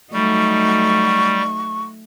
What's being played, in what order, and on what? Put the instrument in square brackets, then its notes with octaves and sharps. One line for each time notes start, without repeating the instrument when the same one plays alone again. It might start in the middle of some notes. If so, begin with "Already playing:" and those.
[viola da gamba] F#3 A3 D#4 [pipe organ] G3 [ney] C#6